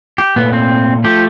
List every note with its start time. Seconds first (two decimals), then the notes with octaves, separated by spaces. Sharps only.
0.18 G4
0.36 A#2 A3 B3
0.53 C4
1.04 F3 A3 G4